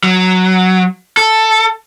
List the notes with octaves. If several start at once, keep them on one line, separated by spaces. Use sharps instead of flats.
F#3
A4